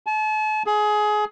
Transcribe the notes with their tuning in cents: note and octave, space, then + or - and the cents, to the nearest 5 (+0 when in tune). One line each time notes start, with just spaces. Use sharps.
A5 -40
G#4 +20